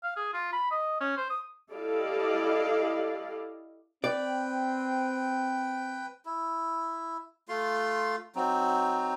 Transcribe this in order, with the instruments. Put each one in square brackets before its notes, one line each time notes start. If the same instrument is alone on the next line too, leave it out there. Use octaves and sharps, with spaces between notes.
[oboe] F5
G#4
F4
B5
D#5
C#4
C5
D#6
[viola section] E4 G4 A4 D5 D#5 F5
[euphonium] C4 [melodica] B4 G5 [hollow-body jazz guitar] D5
[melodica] E4
A3 F4 C6
F#3 C4 D#4